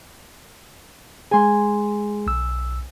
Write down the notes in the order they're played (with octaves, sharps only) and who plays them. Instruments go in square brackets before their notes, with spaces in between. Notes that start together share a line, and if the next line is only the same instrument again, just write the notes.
[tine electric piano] G#3 G#4 [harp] G#5 C6
[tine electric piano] B1 E6